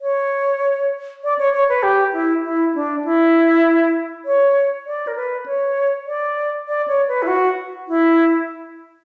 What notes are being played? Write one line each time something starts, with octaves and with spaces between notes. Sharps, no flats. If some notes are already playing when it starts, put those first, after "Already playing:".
C#5
D5
C#5
C#5
B4
G4
E4
E4
D4
E4
C#5
D5
A#4
B4
C#5
D5
D5
C#5
B4
E4
F#4
E4